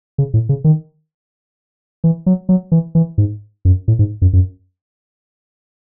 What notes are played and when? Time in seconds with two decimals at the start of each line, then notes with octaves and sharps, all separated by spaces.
0.18 C#3
0.34 A2
0.49 C#3
0.64 D#3
2.04 E3
2.26 F#3
2.49 F#3
2.72 E3
2.95 E3
3.18 G#2
3.65 F#2
3.88 A2
3.99 G#2
4.22 F#2
4.33 F#2